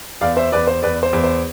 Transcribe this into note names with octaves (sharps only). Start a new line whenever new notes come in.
E2 D5 F5
C5 E5
E2 B4 D5
C5
E2 B4 D5
C5
E2
C5